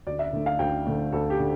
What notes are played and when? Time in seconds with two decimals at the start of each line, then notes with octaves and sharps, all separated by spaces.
0.07 D2 D5
0.19 E5
0.33 D3 A3
0.46 F5
0.59 D2 G5
0.86 D3 A3
1.12 D2 A4
1.30 G4
1.39 D3 A3